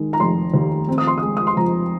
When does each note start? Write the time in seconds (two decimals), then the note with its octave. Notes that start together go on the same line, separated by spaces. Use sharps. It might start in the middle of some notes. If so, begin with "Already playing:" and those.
Already playing: D#3 G#3
0.13 A#5
0.20 F1 C6
0.54 D#2
0.88 C4
0.98 D#6
1.07 C6
1.18 G#3 D#6
1.37 D#6
1.47 C6
1.57 F2 A#5